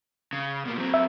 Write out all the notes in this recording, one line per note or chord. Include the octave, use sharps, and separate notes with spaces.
C#3
B2 A#3
F#3 C4
E5